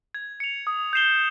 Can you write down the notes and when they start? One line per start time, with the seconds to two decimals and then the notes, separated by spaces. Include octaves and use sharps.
0.14 G#6
0.40 C#7 F7
0.67 D#6
0.93 G6 C7 E7 G7